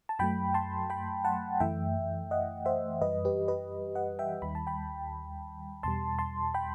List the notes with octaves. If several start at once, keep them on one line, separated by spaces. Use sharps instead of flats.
A5
F#2 F#3 A3 G5 B5
A5 C6
G5 B5
F#5 A5
F#2 E3 A3 E5 G5
D#5 F#5
C5 E5
F#2 E3 G3 B4 D#5
G4 B4
B4 D#5
D#5 F#5
E5 G5
D#2 D#3 G3 B5
A5
G5 B5
E2 B2 G3 A5 C6
A5 C6
G5 B5